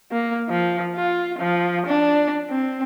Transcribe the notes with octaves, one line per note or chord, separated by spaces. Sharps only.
A#3
F3
F4
F3
D4
C4